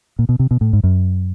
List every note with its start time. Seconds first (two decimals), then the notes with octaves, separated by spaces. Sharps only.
0.19 A#2
0.29 B2
0.39 C3
0.51 B2
0.61 A2
0.73 G#2
0.84 F#2